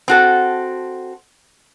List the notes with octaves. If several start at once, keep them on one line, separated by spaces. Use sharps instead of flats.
C4 F#4 A4